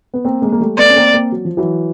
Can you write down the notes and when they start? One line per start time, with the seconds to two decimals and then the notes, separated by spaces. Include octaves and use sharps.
0.14 B3
0.25 A#3 C4
0.42 G#3 A#3
0.52 A#3
0.60 G3 A3
0.78 A3 B3 D5
0.90 C#4
0.96 A#3 C4
1.14 A#3 C4
1.32 F#3
1.45 F3
1.57 E3 F#3